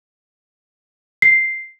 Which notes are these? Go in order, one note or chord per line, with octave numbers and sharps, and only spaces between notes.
C7